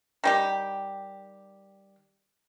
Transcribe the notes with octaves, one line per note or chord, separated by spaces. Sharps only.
D#3 G3 G4